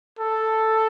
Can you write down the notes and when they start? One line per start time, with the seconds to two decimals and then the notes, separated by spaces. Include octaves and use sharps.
0.19 A4